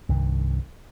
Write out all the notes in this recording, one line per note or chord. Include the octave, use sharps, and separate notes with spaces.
C2 G2 D#3